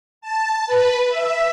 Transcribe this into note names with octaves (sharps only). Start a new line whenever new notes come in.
A5
B4
E5